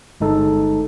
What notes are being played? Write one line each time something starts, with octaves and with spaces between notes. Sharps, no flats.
G1 G#3 D#4 A4